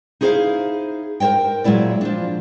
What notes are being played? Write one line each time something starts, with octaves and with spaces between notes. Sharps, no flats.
D#4 E4 G#4 C5 D5 F5
A#4 C5 C#5 D#5 G5
A#2 F#3 G#3 E4 D5
F3 D4